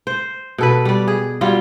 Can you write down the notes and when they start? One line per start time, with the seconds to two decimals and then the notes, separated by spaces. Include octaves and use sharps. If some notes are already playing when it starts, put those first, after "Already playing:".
0.07 C5
0.58 B2 A4 B4
0.85 G3 D5
1.08 G#4
1.41 F#3 G3 F4